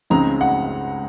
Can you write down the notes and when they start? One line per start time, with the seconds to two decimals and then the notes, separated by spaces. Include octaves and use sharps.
0.10 C#2 C#3 G#3 C4 D#4 A#5
0.41 F#5